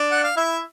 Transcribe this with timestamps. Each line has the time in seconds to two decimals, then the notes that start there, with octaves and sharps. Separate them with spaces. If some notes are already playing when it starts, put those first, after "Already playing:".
Already playing: D4 D5
0.12 F#5
0.24 F5
0.36 E4 E5